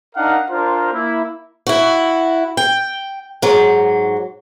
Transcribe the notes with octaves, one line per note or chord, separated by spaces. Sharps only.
D4 D#4 A#4 F5 F#5
D4 F4 A#4 C5
A#3 E4
E4 F#4
G5
G#2 F#3